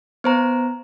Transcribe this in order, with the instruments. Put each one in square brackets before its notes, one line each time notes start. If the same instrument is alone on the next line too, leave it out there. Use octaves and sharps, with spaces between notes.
[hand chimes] B3 C5 A#5